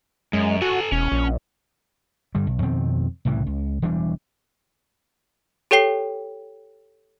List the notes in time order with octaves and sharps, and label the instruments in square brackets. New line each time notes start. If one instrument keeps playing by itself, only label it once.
[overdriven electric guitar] F#2 [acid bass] G#3
[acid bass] F#4 [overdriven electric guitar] A4 G#5
[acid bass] E1 [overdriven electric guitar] C#4
[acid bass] A#1
[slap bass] G2 D3 G3
B1
F2 B2 D#3 C4
C2 A2 C#3 E3
C#2
E1 E3 G3 D4
[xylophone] G4 A4 C#5 G5 C7 G7